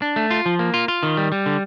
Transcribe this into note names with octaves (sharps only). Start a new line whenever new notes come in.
D4
A3
F4
F3
A#3
F4
F4
D#3
G3
G3
D3